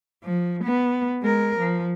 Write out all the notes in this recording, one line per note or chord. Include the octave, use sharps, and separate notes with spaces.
F3
B3
G#3 A#4
F3